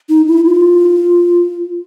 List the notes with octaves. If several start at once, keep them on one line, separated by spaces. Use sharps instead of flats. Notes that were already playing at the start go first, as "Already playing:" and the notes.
D#4
E4
F4